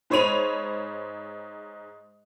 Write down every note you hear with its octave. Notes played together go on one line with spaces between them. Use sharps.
G#2 C5 C#5 B5 D#7 F7